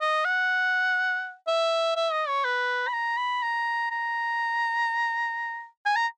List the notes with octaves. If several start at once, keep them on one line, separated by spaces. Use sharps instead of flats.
D#5
F#5
E5
E5
D#5
C#5
B4
B5
A#5
B5
A#5
A#5
G#5
A#5